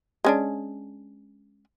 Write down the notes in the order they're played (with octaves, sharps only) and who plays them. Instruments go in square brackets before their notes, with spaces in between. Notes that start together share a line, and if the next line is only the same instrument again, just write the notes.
[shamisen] G#3 C#4 D4